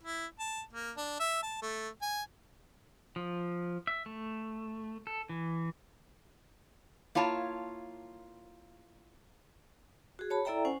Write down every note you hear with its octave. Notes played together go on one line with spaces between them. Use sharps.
E4
A5
A#3
D4
E5
A5
A3
G#5
F3
E5
A3
A4
E3
A#3 E4 F4 C#5 A5
F#4 G#4
C#5 A5 B5
E4 A4 D5 E5 G5 A#5
C#4 C5 F#5 G#5